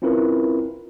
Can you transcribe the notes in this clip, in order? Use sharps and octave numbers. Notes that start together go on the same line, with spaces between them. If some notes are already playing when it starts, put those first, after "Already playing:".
C4 C#4 E4 F4 A#4 B4